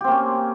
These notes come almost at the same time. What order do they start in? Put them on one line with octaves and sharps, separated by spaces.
G4 C4 A#3 C#4